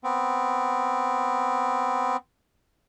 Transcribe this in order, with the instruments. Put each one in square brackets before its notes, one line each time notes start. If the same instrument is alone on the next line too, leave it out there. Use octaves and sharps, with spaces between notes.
[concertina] B3 C4